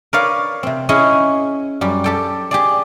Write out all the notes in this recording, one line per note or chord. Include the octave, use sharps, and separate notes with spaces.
A#4 B4 C#5 D5 F5
C3 C4
C#4 E4 G#4 C#5 D#5
F#2 G3
G4 A4 G5
G4 G#4 D5